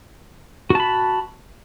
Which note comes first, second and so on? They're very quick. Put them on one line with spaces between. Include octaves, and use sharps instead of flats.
F#4 A5 B5